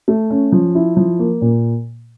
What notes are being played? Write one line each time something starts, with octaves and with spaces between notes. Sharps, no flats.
A3
C#4
F3
E4
F3
A#3
A#2